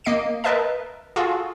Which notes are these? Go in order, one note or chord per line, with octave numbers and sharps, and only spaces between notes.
A#3 D#5 C7 D7 D#7
A#4 B4 D#5 E5 A5
F4 F#4 G#4 A4 F5